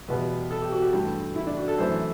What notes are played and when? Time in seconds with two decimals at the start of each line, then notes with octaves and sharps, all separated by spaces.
0.08 E2 B2 G3 B4
0.51 A4
0.62 G4
0.72 F#4
0.82 G4
0.93 G2 E3 A3
1.36 E4
1.47 D4
1.58 F#4
1.68 A4
1.78 F#2 E3 A3 C5